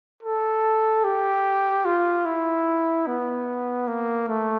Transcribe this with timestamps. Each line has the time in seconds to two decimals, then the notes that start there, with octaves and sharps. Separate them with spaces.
0.23 A4
1.04 G4
1.85 F4
2.25 E4
3.07 B3
3.87 A#3
4.28 A3